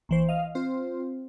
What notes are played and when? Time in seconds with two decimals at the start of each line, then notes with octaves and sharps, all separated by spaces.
0.09 A#1 E3 C5
0.29 D#5 F5
0.55 C4 F4 C5